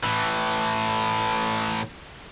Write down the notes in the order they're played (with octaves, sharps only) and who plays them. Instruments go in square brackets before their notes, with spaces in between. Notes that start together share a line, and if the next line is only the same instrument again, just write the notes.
[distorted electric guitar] A2 E3